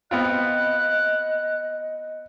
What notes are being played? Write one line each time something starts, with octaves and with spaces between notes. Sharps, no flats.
B3 C4 F4 D#5 F#6